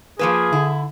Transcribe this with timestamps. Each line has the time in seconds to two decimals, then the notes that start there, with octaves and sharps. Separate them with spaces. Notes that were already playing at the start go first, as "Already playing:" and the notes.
0.19 F3 A#3 G#4 B4
0.52 D3 E4